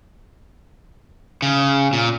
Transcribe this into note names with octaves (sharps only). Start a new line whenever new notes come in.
C#3
A#2